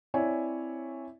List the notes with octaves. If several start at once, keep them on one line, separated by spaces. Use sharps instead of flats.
C4 E4 C#5 D5 E5 G#5